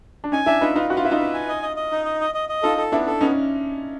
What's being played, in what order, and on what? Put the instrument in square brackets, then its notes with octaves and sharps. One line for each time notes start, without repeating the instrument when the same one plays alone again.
[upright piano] D4
[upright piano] C#4 D#4 [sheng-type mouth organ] G#5
[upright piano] D4 E4 [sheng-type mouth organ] E5
[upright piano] D#4 F4 [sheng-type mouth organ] B4
[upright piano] D#4 F4 [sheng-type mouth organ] B4
[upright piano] F#4 [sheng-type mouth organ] B4
[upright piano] F4
[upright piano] E4 [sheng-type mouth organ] E5
[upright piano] D#4 F4
[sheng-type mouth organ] B4
G#5
D#5
D#5
D#5
D#4
D#5
D#5
D#5
D#5
[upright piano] D#4 F4 [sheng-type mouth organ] A4
[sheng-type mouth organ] A4
[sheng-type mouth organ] B3 [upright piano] D4 E4
[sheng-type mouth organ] A4
[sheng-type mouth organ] B3 [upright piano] C#4 D#4